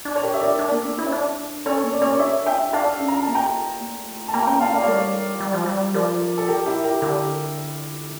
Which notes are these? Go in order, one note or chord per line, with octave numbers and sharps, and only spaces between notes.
D4
C#5
G4 A#4
E5
A#4 D5
D4
A#3
D4
E4
C#4
D4
C#4 A4 C#5
A#3
D5
C#4 C#5
A#4 D5
D4 C#5 E5
E5 G5
D4 F5 A5
C#4
A#5
A5
A#3
G5 A#5
A3
A5
A#3 G5 A#5
C#4 G5 A#5
A#3 F5 A5
A3 D5 F5
C#5
G3 A#4 D5
G3
F3
G3
F3 A#4 D5
A4
G4 A#4
E4 G4
G4 A#4
D3 G4 A#4